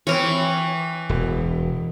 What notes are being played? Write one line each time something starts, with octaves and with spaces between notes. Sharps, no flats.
E3 C4 A#4 C#5
E1